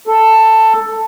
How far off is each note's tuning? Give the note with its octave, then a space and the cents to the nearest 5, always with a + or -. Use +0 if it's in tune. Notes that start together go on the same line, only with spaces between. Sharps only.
A4 +10